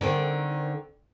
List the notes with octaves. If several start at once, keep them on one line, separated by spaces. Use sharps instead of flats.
D3 D#3 C4